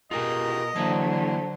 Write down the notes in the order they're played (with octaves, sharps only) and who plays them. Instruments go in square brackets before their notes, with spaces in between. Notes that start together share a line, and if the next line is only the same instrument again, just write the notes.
[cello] B2 A#4 [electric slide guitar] F4 G4 G#4 [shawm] D#5
[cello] D3 F#3 [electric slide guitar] E3 A#3 E4 [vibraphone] C5 A5